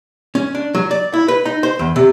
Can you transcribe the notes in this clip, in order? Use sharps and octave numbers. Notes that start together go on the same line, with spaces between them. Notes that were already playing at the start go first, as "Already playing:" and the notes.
C#4
D4
F#3
D5
E4
B4
D#4
C5
E2
C3